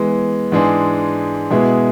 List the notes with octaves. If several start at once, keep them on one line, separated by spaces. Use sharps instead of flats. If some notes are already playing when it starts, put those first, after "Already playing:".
Already playing: E3 G#3 B3
G#2 E3 G#3 D4 G#4
B2 G#3 B3 E4 G#4